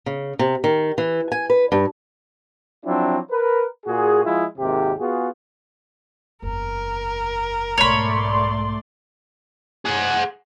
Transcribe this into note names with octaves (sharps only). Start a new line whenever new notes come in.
C#3
C3
D#3
E3
G#5
B4
G2
F3 F#3 C4 D4 E4
A#4 B4
A#2 F#4 G#4
F3 G#3 E4 F4 G#4
G#1 D#2 G#2 C3 G4
B3 F4 F#4 G#4
F#1 E2 A#4
B1 G#2 A3 C#5 D5 B5 C6
G#4 F#5